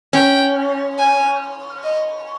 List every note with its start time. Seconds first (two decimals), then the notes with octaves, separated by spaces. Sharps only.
0.13 C#4 G5
0.98 G#5
1.84 D#5